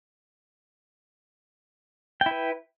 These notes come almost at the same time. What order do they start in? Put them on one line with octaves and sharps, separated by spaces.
G5 E4 B4